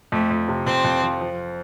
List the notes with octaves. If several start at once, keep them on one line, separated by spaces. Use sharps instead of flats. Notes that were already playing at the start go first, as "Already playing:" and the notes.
F2 A3
F2
C3
F2 C4
F2
F3
F3